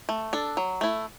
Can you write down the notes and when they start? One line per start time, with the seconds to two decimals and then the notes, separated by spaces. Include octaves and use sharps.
0.09 A3
0.33 D4 A4
0.57 F#3
0.81 A3 E4